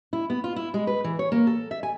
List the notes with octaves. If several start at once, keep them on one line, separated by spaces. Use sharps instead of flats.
E4
B3
F4
E4
G#3
B4
E3
C#5
A#3
A4
E5
G#5